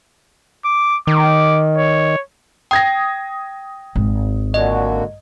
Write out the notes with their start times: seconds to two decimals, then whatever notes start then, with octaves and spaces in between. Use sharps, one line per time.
0.65 D6
1.07 D#3 D6
1.77 C#5
2.71 G5 D#6 G#6 A#6
3.96 G#1
4.54 A#2 D3 F#4 D#5